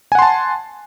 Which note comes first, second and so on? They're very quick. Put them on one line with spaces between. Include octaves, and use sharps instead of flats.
G#5 F#5 C6 A5